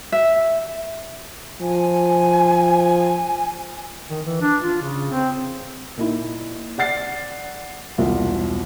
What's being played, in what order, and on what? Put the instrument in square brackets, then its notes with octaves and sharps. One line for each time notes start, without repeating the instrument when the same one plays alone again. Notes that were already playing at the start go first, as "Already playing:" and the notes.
[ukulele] E5
[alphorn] F3 [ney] G#5
[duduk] D#3
E3
D4
F4
C#3
C4
[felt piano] A#2 D#4 E4
D5 F#5 A6 C7
E1 C2 F4